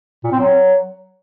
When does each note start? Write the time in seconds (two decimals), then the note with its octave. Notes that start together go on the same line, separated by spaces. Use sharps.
0.24 A#2
0.32 C4
0.40 F#3